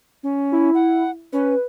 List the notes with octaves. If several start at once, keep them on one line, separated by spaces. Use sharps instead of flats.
C#4
E4
F#5
C#4 B4